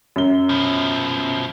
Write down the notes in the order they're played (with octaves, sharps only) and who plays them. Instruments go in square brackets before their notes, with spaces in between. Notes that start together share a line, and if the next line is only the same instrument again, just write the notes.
[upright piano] F#2 G7
[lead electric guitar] B2 F3